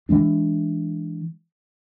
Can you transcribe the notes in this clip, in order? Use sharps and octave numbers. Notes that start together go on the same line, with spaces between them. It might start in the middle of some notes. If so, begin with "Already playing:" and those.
E3 F3 G#3 D4